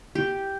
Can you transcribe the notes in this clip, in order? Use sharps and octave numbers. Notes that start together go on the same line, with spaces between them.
G4